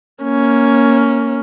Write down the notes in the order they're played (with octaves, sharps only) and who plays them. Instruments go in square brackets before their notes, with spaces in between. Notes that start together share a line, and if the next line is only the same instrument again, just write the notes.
[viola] A#3 C#4